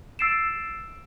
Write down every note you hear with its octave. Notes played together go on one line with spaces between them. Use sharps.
E6 A6 C7 D7 E7